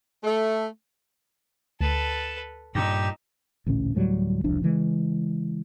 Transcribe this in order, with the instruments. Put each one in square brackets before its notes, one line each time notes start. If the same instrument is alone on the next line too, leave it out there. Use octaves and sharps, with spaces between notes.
[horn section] A3
[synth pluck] D2 [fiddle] A4 B4 [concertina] A5
[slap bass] G2 A#2 [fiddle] D#4 E6 [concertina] G4 [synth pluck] A#6
[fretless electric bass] A1 D2 A#2 C#4
D2 A2 F#3 G3
E1 C2 F3 D4
C#3 E3 G#3